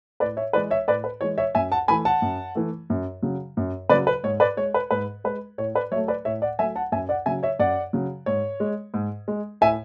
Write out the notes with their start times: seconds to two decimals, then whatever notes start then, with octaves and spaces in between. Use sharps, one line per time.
0.20 A2 B4 D5
0.37 C#5 E5
0.53 E3 G#3 B4 D5
0.71 C#5 E5
0.87 A2 B4 D5
1.04 B4
1.21 E3 G#3 C#5
1.38 C#5 E5
1.55 F#2 E5 G#5
1.72 F#5 A5
1.88 E3 A3 G#5 B5
2.05 F#5 A5
2.22 F#2
2.55 E3 A3
2.90 F#2
3.22 C#3 F#3
3.57 F#2
3.89 C#3 B4 D5
3.93 F#3
4.07 B4
4.24 G#2 C#5
4.40 B4 D5
4.57 G#3 C#5
4.74 B4
4.91 G#2 B4
5.24 G#3 B4
5.58 A2 C#5
5.75 B4 D5
5.91 F#3 C#5 E5
5.96 A3
6.08 B4 D5
6.25 A2 C#5 E5
6.42 D5 F#5
6.59 F#3 A3 E5 G#5
6.76 F#5 A5
6.92 F#2 E5 G#5
7.09 D5 F#5
7.26 C#3 F#3 E5 G#5
7.43 C#5 E5
7.59 F#2 D5 F#5
7.93 C#3 F#3
8.26 G#2 C#5
8.60 G#3
8.94 G#2
9.28 G#3
9.61 A2 E5 G#5